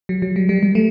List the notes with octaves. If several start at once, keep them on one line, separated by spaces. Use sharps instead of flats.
F#3
F#3
G3
G3
G3
A3